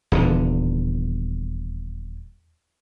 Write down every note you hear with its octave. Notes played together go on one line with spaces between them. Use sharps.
D#1 E2 D3